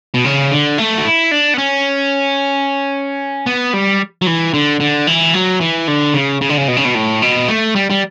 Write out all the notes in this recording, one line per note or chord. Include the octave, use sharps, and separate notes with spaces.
B2
C#3
D3
A3
F#4
E4
D4
B3
C#4
B3
G3
F#3
E3
D3
D3
E3
F#3
E3
D3
C#3
C#3
D3
C#3
B2
C#3
B2
A2
B2
A3
G3
G3